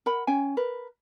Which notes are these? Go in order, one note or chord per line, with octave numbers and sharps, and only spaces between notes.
A#4 F#5 B5
C#4 G5 G#5
A#4 B4